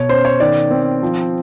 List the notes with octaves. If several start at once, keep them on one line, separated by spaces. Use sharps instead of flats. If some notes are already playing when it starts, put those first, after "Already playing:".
Already playing: B2 C#5
C#4 C5
C#5
D#3 D5
C4
F3